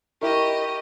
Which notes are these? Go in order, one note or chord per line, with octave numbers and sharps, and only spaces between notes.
E4 G4 A#4 D#5 C#6